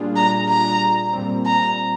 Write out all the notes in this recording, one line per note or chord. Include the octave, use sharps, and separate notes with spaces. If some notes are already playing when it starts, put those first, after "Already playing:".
Already playing: A#2 G3 D4 F4 G#4
A#5
A#5
A#2 G3 C4
A#5